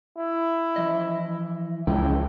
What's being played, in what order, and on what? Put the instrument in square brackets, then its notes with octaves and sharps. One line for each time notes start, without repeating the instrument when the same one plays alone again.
[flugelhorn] E4
[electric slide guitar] E3 F3 D#5
[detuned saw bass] C#2 [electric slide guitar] F3 E4 [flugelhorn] G5